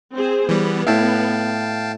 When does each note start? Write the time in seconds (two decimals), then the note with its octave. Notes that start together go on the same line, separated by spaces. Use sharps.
0.16 C4 G#4 C5
0.49 E3 G3 B3
0.87 A2 E4 F5 G5 A5